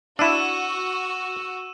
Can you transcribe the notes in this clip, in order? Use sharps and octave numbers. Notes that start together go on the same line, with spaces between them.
D4 E4 F#4 E6 D#7 E7